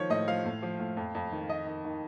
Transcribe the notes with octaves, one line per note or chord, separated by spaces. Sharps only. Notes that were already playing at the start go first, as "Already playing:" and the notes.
Already playing: D#3 F3 C#5
A2 D#5
F3 F5
A2
F3
A2
F2
F2
D#3
D#3 D#5
D#3
D#3